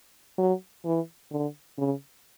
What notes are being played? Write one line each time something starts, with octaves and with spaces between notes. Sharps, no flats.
F#3
E3
D3
C#3